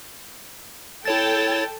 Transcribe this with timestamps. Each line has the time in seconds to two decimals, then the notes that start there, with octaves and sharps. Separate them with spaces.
1.05 E4 A4 C#5 G5 A5 A6